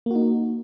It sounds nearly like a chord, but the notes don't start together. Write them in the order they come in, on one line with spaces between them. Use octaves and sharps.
A#3 F#4 D#4